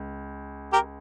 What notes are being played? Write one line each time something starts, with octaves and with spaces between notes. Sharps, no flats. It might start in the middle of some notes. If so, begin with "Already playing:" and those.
Already playing: C#2
G4 A#4